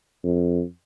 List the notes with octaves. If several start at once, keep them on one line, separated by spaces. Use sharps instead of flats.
F2